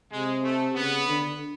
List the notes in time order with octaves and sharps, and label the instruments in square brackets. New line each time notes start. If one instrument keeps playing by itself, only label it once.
[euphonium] C3 [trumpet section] G#3
[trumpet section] A3
[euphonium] C#3 [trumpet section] B3
[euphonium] D3